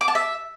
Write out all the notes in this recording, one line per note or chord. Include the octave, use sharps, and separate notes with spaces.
D6
A5
E5